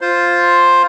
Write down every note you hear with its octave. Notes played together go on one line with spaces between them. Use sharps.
F4 C5